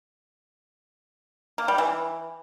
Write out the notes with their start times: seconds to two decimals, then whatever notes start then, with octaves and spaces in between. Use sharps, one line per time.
1.58 A#3
1.68 G3
1.78 E3